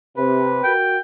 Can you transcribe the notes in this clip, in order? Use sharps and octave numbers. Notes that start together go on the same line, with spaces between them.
C3 B4
F#4 A#4 G5